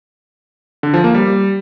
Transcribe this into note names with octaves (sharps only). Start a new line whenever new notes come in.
D3
F3
A#3
G3